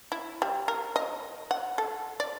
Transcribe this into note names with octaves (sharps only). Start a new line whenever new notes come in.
E4
G3
A#4
D#5
F#5
A4
D5